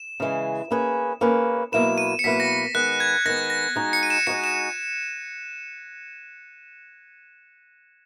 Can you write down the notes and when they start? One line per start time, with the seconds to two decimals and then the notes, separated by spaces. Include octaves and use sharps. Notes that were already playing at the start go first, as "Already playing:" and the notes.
Already playing: E7
0.20 C#3 E3 G#3
0.71 A#3 C#4 G#4 B4
1.21 A#3 C#4 G#4 B4
1.72 B2 F#3 A#3 E4 B4 E7
1.98 D#7
2.19 C#7
2.24 B2 F#3 A#3 E4 B4 B6
2.40 A#6
2.74 D#3 G#3 B3 F#6
3.00 G#6
3.25 D#3 G#3 B3 A#6
3.50 A#6
3.76 G#3 D#4 F#4
3.93 C#7
4.03 D#7
4.10 E7
4.27 G#3 D#4 F#4 C#7
4.44 E7